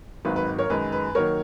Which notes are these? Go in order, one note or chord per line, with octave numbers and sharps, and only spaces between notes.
G#1 G#2 D#3 F#3 B4
B4
A#4 C#5
F#2 D#3 G#3 B4
B4
D#3 F#3 A#3 A#4 C#5